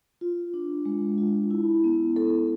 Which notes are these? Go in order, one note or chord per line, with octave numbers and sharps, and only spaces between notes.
F4
D4
G#3
F4
E4
B3
A4